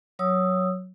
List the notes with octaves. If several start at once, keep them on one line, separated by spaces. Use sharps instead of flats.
F#3 C#5 D#6 E6